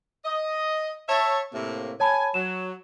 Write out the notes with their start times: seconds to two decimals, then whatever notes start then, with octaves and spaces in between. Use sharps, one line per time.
0.25 D#5
1.08 C#5 E5 A5
1.53 A2 C3 A#3
2.00 C#5 G#5 A5 B5
2.34 F#3 E7